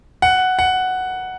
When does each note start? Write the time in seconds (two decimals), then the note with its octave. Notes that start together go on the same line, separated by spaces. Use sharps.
0.22 F#5
0.59 F#5